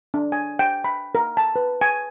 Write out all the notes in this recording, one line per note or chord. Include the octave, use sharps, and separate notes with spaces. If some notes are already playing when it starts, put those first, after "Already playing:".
D4
G#5
G5
B5
A#4
A5
B4
G#5